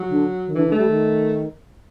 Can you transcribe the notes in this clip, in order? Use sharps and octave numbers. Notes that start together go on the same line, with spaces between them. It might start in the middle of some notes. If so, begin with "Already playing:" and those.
Already playing: F#3
D3
D#3
D3 E3
D3
A3
G3
D#3